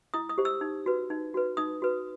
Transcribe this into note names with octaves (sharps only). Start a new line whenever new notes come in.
E4 D#6
D#6
G4 C5
E6
D#4
F#4 B4
D#4
F#4 B4
D#4 D#6
F#4 B4